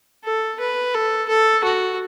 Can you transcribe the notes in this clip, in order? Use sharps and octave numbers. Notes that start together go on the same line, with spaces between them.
A4
B4
A4
A4
F#4